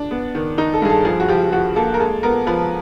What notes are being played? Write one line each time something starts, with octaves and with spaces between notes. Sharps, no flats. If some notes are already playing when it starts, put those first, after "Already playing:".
Already playing: D4
B3
D#3
D#3 D#4
A4
G2 G#4
A4
F3 G#4
F#4
F3 G4
F3 F#4
A#3 A4
A#4
G#3 A4
B3 A#4
F3 B4